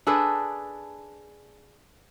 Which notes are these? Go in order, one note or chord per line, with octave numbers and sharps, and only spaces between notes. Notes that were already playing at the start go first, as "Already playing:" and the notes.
D4 G#4 A4 B4